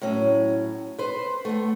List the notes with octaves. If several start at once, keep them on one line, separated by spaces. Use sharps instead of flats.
A2 F#3 C#4
B4 C5
A3 B3